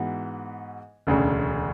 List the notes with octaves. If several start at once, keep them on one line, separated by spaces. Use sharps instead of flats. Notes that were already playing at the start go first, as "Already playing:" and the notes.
Already playing: G#2 E3 B3 F#4
E1 D2 C#3